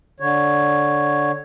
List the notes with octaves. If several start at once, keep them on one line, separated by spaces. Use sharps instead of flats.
D3 C#5